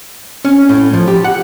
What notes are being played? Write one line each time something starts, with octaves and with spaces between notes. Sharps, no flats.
C#4
A2
F3
G4
F#5